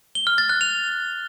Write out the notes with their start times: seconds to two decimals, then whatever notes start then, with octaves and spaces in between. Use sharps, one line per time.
0.15 G7
0.27 F6
0.38 A6
0.49 F#6
0.61 F7